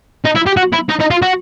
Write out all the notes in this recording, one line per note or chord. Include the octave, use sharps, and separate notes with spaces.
D#4
E4
G4
F#4
E4
D#4
D#4
F4
F#4